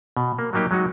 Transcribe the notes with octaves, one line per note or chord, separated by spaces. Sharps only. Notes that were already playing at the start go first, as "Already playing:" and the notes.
B2
A#3
F#3 G3 A#3 D#4 G4
F#3 G#3 D#4 F#4